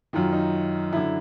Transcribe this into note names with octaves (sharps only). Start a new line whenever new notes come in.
F#2 D#3 F4
D#4
F#2 D3 E4